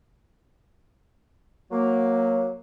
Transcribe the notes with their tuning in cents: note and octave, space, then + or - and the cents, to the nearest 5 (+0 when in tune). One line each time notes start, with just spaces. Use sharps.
F#3 -10 A#3 +0